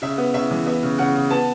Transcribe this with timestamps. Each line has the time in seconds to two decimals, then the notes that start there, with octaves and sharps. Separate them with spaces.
0.02 C#3 E5
0.18 B3
0.34 C#3 E5
0.51 E3
0.66 B3 E5
0.83 C#3
0.98 C#3 F#5
1.15 C#3
1.30 B3 A5